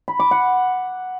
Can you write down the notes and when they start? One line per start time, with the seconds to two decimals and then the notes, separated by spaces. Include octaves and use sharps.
0.08 B5
0.20 D6
0.31 F#5